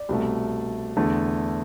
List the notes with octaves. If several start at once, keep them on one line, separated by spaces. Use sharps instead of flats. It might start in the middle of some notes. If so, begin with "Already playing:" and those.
Already playing: D5
C2 B2 A3
E2 D3 A3